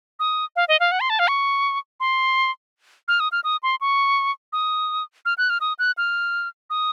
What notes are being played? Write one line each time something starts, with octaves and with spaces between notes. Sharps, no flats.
D#6
F5
D#5
F5
F#5
C6
A5
F5
C#6
C6
F6
D#6
F6
D#6
C6
C#6
D#6
F6
F#6
F6
D#6
F#6
F6
D#6